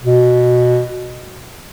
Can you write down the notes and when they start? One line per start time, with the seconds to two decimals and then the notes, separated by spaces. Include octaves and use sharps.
0.03 B2